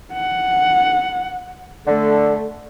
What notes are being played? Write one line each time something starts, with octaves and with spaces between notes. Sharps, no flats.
F#5
D3 A3